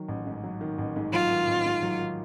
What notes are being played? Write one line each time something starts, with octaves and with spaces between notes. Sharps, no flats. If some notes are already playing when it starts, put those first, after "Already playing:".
Already playing: D#3 F#3
A1
G#2
F#3
D#3
A1
G#2
F#3 F4
D#3
A1
G#2
F#3
D#3